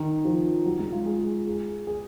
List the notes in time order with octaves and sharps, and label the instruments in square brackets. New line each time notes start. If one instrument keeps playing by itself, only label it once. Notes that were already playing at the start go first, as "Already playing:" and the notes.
Already playing: [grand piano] D#3
F3
F#3
G#3
F4
G#4
G#4
G#4